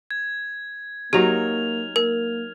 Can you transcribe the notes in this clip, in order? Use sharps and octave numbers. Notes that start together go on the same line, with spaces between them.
G#6
F#3 A#3 D#4 G4 G#4 F6 F7
A#3 A#4